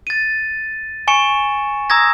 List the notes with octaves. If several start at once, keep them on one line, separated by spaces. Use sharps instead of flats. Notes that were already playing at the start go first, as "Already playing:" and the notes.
A6 D#7
G#5 C#6 C#7 E7
A#5 D#6 E6 G#6 A#6